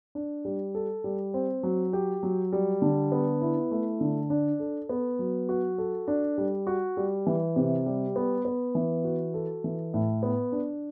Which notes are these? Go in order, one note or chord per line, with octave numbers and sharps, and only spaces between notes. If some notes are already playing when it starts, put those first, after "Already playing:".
D4
G3
A4
G3
C4
F#3
G4
F#3
G3
D3
B3
E4
A3
D3
D4
A4
B3
F#3
F#4
A4
D4
G3
F#4
G3
E3
C3
G3
B3
B3
E3
F#4
A4
E3
A2
B3
D4